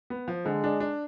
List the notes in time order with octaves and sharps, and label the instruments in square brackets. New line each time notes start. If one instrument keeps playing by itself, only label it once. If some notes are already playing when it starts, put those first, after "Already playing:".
[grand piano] B3
F3
[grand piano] D3 [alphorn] G#3
[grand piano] D4
D4